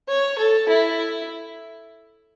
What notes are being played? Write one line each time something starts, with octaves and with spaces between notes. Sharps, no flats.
C#5
A4
E4